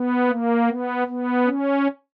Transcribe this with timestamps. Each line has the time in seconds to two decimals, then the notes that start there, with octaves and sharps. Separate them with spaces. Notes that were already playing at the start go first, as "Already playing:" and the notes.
Already playing: B3
0.28 A#3
0.68 B3
1.07 B3
1.46 C#4